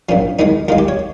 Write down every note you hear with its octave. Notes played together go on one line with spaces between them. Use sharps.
A#1 A#2 F3 C#4
D#2 D#3 G#3 D#4
D#2 D#3 G#3 F4
G4
C#5